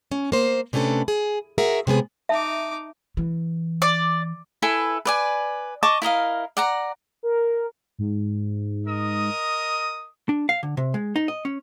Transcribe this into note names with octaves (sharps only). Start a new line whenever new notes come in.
C#4
A#3 C5
C3 A3 C#4 D4 A4 B4
G#4
F#4 G#4 A#4 E5 F#5
C3 G#3 B3 G#4
D#4 E5 A5 D6
E3
D5
E4 A4 B4 G#5
B4 D5 G#5
D#5 A5 C#6 D6
E4 A#4 D#5 F5
D5 F#5 A#5
A#4
G#2
A#4 D#5 D#6
D4
F5
D3
C3
G#3
D#4
D#5
C#4